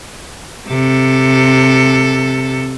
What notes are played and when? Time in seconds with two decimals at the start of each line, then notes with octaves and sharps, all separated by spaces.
0.68 C3 A4